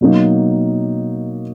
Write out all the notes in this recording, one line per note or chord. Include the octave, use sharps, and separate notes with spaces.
B2 F#3 A#3 D#4